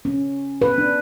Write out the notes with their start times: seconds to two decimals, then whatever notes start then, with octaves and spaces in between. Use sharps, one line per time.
0.05 C#4
0.62 B4
0.78 D4